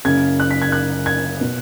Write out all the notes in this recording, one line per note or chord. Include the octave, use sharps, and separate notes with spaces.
F#1 F#2 C#3 G#6
F#6
B6
G#6
F#6
G#6
B2